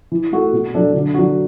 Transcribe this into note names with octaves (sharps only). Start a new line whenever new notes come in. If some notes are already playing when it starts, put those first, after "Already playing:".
E3
A3 F#4 A4
B2
F#3 D4 A4
D3
F#3 D4 F#4